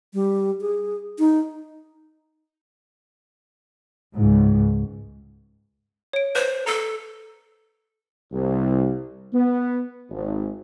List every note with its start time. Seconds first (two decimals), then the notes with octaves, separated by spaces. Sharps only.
0.14 G3
0.61 G#4
1.19 D#4
4.15 C#2 G#2
6.13 C#5 D7
6.35 B4 C5
6.66 A4 A#5
8.32 C2
9.33 B3
10.10 G#1